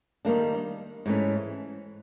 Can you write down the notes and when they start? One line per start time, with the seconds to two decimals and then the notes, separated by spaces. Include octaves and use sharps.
0.25 D#3 G3 A#3 D4
1.06 G#2 E3 A3 C#4